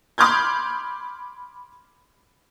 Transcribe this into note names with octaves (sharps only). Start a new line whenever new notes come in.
B5 C6 D6 F6 G6 G#6